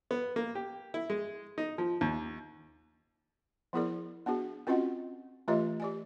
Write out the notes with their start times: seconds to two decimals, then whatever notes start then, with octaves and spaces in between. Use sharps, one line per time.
0.11 B3
0.36 A#3
0.55 G4
0.94 E4
1.10 G#3
1.58 D#4
1.78 F3
2.01 D#2
3.73 F3 B3 E4 G#4 A#4 D5
4.26 B3 D4 F#4 G#4
4.67 C4 C#4 F4 F#4 D#5 F#5
5.48 E3 A3 F4 G4 C#5 D#5
5.80 G4 D5 G#5